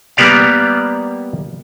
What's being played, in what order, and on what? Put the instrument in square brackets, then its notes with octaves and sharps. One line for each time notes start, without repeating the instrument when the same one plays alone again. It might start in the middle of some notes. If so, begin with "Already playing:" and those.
[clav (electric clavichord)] G3 A#3 B3 G4 D5 F5